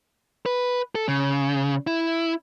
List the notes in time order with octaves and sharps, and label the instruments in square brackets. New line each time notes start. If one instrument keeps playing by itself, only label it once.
[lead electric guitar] B4
A4
C#3
E4